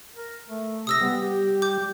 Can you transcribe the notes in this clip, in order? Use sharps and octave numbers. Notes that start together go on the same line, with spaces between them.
A#4
A3
C3 D#6 E6 A#6
G3 B3
G4
D6 G6